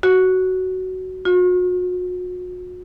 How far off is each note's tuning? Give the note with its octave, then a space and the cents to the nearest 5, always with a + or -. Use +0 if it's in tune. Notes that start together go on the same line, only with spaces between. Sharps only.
F#4 +10
F#4 -40